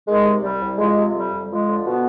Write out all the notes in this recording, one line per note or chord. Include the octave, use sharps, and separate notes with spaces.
D#3 G#3
C3
C2 G3
C2
F3 G#3
C3
F2 G3
F2
F3 G#3
D3
B2 B3